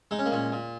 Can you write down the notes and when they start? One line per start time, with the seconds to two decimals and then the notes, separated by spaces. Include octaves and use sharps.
0.11 G#3 D#4
0.19 C#4
0.26 A#3
0.32 A#2 C#4
0.52 A#2